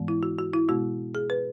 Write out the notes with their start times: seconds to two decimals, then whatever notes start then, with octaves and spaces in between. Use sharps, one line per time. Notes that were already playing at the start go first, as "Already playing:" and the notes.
Already playing: G#2 E3 G#3 B3
0.08 E4
0.23 F#4
0.39 F#4
0.53 E4
0.68 B2 G#3 B3 F#4
1.15 G#4
1.30 B4